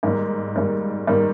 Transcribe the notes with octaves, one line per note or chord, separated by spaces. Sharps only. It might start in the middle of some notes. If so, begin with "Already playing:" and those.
G#2 D#3 G3 A#3
G#2 D#3 G3 A#3
G#2 D#3 G3 A#3